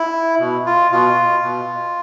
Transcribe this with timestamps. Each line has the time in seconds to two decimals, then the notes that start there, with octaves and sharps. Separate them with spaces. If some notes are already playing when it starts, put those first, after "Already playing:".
Already playing: E4
0.40 B2
0.66 F4
0.91 B2 F4
1.43 B2